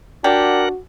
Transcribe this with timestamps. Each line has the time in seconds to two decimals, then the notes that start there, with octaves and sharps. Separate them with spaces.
0.24 D4 F#4 G4 A#4 F#5